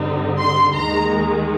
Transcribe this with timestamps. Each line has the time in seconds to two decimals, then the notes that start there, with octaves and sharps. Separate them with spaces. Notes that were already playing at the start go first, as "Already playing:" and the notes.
Already playing: G2 D3 G3 C4 D#4
0.38 C6
0.74 D#2 D#3 G#3 A#5